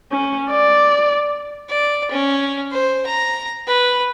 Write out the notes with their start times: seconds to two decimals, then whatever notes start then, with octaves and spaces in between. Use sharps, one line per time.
0.12 C#4
0.50 D5
1.69 D5
2.11 C#4
2.71 C5
3.06 A#5
3.67 B4